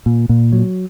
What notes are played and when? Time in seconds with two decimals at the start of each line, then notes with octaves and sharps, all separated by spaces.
0.06 A#2
0.29 A#2
0.52 F#3